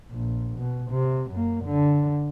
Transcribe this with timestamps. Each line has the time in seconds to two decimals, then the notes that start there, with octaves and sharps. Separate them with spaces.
0.11 A#1
0.58 B2
0.91 C3
1.31 F#2 A#3
1.65 D3